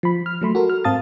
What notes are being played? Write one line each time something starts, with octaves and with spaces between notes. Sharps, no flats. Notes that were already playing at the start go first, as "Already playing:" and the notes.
F3 B5
F6
F#3 A3 B5 C6
F#4 A4 A#4
F6
G#2 C4 F5 A5 D#6 A6